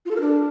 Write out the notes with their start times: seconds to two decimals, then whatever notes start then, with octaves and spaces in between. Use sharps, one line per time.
0.05 F4
0.11 A4
0.16 A#4
0.21 D4